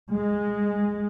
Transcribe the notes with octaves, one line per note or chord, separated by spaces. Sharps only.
G#3